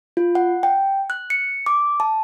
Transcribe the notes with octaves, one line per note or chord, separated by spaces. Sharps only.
F4
F#5
G5
F#6
C#7
D6
A5